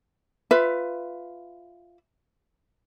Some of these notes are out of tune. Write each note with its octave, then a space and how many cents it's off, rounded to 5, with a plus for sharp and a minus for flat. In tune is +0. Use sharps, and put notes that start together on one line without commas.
F4 +0 B4 +15 E5 +0